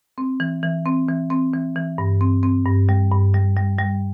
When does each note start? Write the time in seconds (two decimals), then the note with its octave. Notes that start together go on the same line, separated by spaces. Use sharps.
0.18 C4
0.40 E3
0.63 E3
0.86 C4
1.08 E3
1.30 C4
1.53 E3
1.76 E3
1.98 G2
2.21 C4
2.43 C4
2.66 G2
2.89 G3
3.12 G2
3.34 G3
3.57 G3
3.79 G3